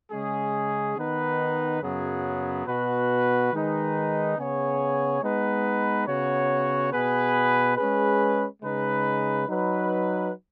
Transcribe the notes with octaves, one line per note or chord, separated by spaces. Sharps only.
C#3 G#3 C#4 G#4
D#3 B3 D#4 B4
F#2 C#3 F#3 B3 G#4
B2 B3 F#4 B4
D#3 G#3 D#4 B4
C#3 B3 G#4 C#5
G#3 B3 D#4 B4
C#3 B3 F#4 C#5
B2 B3 G#4 B4
G#3 C#4 G#4 B4
C#3 G#3 D#4 B4
F#3 D#4 B4